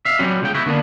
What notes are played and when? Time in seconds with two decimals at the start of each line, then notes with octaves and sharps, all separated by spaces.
0.05 E5 F5
0.19 F#3 G3 C4 C#4 F#4
0.42 C#2 C#3 G5
0.54 B3 E4 F#4
0.66 D3 A#3 B3 D4